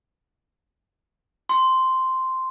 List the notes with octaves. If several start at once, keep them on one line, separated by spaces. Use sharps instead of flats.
C6